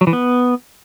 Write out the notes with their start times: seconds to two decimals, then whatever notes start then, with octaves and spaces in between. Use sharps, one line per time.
0.01 F#3
0.07 E3
0.13 B3